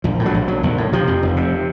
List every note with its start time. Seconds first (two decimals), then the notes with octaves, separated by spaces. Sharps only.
0.04 A#1 F3
0.19 A2
0.26 F#3
0.34 A#1
0.48 A#1 F#3
0.63 A#1
0.78 A2
0.92 C3 F3
1.08 F2
1.23 F1
1.36 C3